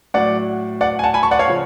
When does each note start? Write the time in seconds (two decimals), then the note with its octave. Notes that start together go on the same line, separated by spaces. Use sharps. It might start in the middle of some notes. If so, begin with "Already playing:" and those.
0.14 A2 F#3 D5 F#5
0.81 D5 F#5
0.99 G#5
1.03 F#5 A5
1.14 G#5 B5
1.23 A5 C#6
1.31 D5 F#5
1.39 C#5 F5
1.48 C#3 F3